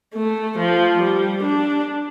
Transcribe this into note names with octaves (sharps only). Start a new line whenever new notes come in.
A3
F3
G3
D4